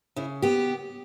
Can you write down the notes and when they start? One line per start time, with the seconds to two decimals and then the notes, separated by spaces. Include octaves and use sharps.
0.16 C#3 E4
0.42 B3 G4